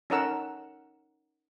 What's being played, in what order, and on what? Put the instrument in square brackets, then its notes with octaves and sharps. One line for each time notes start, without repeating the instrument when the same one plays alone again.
[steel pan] C#4 D#4 A4 A#4 F#5 E6